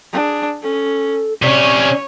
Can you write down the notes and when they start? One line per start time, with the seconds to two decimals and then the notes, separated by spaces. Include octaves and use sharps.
0.13 D4 G#4
0.63 C#4 A4
1.42 C3 C#4 C#5 D5